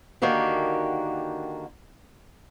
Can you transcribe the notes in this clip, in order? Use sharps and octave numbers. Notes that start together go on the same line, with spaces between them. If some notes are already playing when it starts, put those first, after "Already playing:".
D3 D#3 A#3 F#4 G4